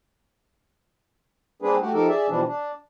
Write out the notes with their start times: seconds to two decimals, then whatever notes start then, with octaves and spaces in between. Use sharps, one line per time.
1.62 G3 A#3 C4 D4 G#4 B4
1.81 A3 F#4 G4
1.94 F3 D#4 G4 A4 A#4
2.08 G#4 D5 E5
2.28 B2 E3 F3 G3 D4
2.47 D4